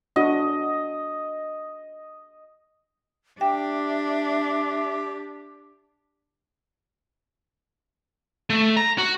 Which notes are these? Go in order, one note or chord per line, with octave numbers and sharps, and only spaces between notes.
D4 F#4 D#5
D4 G4 E5 G5
A3
A#5
F#4